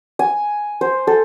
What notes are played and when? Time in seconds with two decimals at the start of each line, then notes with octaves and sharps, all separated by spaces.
0.19 G#5
0.81 C5
1.07 A4